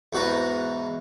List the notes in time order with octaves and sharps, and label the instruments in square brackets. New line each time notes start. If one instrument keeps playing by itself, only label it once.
[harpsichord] E2 G#2 F#4 B4 A#5